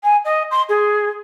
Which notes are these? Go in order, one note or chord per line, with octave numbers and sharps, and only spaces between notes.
G#5
D#5
C6
G#4